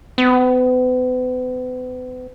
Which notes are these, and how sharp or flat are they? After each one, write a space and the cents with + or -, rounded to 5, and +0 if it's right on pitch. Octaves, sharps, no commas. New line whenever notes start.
B3 +40